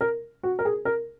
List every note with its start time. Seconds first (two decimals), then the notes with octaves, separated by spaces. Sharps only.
0.01 A#4
0.43 F#4
0.59 A#4
0.65 G#4
0.85 A#4